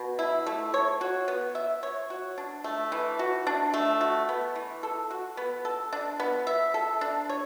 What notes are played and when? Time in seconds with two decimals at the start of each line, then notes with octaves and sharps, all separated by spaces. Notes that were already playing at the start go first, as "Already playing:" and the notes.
Already playing: B2
0.19 E4
0.47 A3
0.74 C#5
1.01 F#4
1.28 B3
1.55 E5
1.83 C#5
2.10 F#4
2.38 D4
2.64 A3
2.92 E3
3.19 F#4
3.47 D4
3.74 A3
4.01 F#4
4.29 B3
4.55 E3
4.83 A4
5.11 F#4
5.37 B3
5.65 A4
5.93 D4
6.20 B3
6.47 E5
6.74 A4
7.01 D4
7.29 C#5